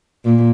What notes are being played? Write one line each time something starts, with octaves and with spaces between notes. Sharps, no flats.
A#2